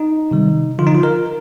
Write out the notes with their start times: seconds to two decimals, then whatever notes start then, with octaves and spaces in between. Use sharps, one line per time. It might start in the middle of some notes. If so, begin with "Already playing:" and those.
Already playing: D#4
0.31 C3 D#3 G3
0.79 D3 F3 F4
0.87 D#4
0.95 F4
1.03 A#4